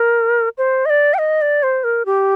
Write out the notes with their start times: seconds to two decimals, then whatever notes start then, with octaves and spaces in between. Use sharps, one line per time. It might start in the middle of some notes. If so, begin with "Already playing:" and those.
Already playing: A#4
0.58 C5
0.86 D#5
0.90 D5
1.14 G5
1.18 D#5
1.42 D5
1.63 C5
1.84 A#4
2.06 G4